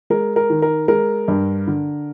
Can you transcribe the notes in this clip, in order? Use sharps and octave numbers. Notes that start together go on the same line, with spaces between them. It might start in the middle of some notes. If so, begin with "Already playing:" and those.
G#3 A#4
A#4
D#3
A#4
G#3 A#4
G2
D3